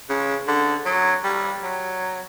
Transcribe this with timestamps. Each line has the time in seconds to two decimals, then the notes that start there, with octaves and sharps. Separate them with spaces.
0.09 C#3
0.48 D3
0.86 F#3
1.24 G3
1.63 F#3